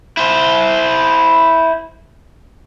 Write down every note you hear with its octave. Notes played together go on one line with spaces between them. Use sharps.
E4 C5